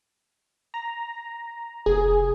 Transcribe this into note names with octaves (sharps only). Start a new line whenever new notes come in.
A#5
F1 G#4